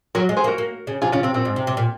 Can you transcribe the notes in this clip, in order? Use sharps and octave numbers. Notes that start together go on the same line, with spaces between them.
F#3 A#4 C#5
G#3
G#4 C5
A#3 F#4 A#4
A#3
C#3
C3 F4 G#4
C#3 C#4 F4
C3 C4
A#2 C4
G#2
C3
C3
A#2